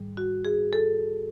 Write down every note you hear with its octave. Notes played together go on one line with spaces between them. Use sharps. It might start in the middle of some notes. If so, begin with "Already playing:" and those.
Already playing: G#2 D#3 G3
F#4
G#4
A4